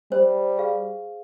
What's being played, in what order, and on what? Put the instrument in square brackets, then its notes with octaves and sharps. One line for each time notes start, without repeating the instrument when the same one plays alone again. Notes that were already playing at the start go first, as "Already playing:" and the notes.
[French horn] G3 [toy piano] C5
[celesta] G#4 F5